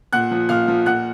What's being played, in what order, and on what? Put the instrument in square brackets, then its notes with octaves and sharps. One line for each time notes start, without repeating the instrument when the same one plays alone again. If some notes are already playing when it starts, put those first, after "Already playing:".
[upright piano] A#2 F#5 F#6
F3
A#2 F5 F6
F3
A#2 F#5 F#6